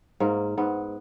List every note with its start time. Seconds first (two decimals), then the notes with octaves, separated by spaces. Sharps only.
0.20 G#2 A#3
0.57 G#2 B3